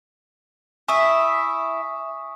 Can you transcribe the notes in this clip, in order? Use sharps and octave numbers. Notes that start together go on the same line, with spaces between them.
E4 E5 G#5 C#6 D#6